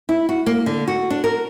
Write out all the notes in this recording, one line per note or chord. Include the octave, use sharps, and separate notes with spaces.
E4
F#4
A#3
D3
F#4
D4
A#4